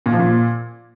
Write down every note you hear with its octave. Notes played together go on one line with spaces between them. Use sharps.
A#2
F3
A#2